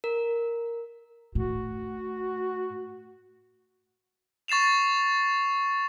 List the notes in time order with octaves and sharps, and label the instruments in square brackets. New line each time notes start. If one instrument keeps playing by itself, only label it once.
[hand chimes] A#4
[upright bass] A2 [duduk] F#4
[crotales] C#6 A6 C7 E7 F7